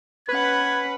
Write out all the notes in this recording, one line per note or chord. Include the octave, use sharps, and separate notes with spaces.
C#4 B4 F#5 G#6